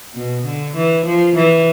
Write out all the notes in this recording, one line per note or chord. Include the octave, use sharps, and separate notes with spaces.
B2
D3
E3
F3
E3